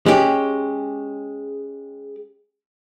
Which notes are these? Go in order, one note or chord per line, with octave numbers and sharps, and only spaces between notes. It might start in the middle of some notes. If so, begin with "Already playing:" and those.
G#3 C#4 G4